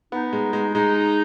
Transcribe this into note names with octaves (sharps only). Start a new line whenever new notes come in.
B3 D#4
G#3
G#3
G#3 D#4